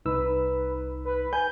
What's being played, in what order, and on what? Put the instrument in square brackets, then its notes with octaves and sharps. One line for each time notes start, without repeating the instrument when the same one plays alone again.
[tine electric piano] C2 D#4 E6 [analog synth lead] B4
[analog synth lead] B4
[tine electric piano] G#5 [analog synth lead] G6